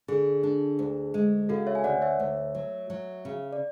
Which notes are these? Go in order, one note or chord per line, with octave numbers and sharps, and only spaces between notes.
D3 G#4
D4
D2
G#3
C#3 F#4 A4
C#5 E5
G#5
D2 D5 F#5
C#5 E5
D2
F#3
F#3
C#3
D5